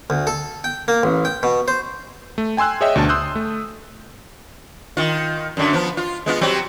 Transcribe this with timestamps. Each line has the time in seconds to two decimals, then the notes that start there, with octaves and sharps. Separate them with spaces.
0.10 D2
0.27 A4
0.64 G5
0.88 A#3
1.03 A1
1.25 G5
1.43 B2
1.68 C5
2.38 A3
2.57 G5 G#5 C6 E6 F#6
2.81 G#4 C#5 D#5 E5 G5
2.95 D2 B2 D4 A5
3.09 C6 D#6 E6 F#6 G6
3.35 A3
4.97 D#3 F4
5.57 F#2 D3
5.73 F3 B3
5.97 F4
6.26 G#3 B3 F4
6.41 F#3 G3 C4